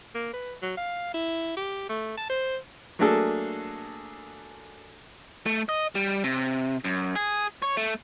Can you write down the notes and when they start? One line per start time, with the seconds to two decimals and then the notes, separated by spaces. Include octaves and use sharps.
0.15 A#3
0.34 B4
0.62 F#3
0.77 F5
1.14 E4
1.57 G4
1.89 A3
2.17 A5
2.30 C5
2.99 F#3 A3 A#3 D4 G#4 A4
5.46 A3
5.69 D#5
5.95 G3
6.24 C3
6.84 F#2
7.16 G#4
7.62 C#5
7.77 A3